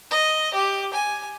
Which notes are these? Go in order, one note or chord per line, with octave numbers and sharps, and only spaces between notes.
D#5
G4
G#5